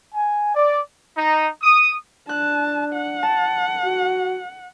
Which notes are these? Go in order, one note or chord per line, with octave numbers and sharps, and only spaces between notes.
G#5
D5
D#4
D#6
D4 A5 F#6
F#5
A5
F#4